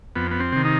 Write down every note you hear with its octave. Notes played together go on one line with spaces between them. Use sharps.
F2 B3
B3
C4
C3 D#3
D#4